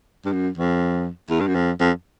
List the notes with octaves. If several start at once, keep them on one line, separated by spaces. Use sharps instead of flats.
G2
F#2
F2
E2
G2
F#2
F2
F2